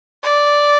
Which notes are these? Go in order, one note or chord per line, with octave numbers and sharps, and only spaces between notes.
D5